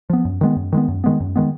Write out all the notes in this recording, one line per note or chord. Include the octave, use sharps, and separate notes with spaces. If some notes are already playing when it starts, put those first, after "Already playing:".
F3 B3
F#2
D#3 G#3 B3
F#2
D#3 G#3 B3
F#2
D#3 G#3 B3
F#2
D#3 G#3 B3